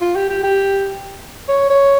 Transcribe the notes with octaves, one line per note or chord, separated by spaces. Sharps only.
F4
G4
G4
G4
C#5
C#5